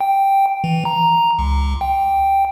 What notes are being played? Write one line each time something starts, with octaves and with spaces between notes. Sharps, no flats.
G5
E3
A#5
C#2
G5